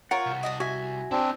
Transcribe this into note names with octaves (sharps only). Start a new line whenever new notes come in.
F4 A#4 C#5 F#5
C2
D4 F#4 D#5
F#4 E5 G#5
C4 D4 E4 D5